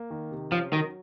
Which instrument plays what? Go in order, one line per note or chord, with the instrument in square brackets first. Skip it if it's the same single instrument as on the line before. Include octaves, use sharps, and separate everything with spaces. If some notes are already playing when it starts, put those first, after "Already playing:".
Already playing: [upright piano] A#3
D#3
C3
[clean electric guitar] F3 [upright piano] C#4
[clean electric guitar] D#3 [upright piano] F#3